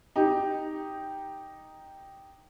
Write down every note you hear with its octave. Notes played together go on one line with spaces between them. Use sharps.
D#4 G4